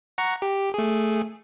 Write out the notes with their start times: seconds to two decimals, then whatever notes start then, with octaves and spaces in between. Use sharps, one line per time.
0.18 F#5 A#5 C#6
0.42 G4
0.74 A3 G#4